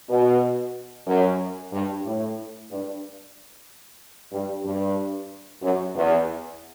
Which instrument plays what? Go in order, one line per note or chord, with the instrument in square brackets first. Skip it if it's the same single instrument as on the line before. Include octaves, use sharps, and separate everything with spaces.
[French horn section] B2
F#2
G2
A2
G2
G2
G2
F#2
E2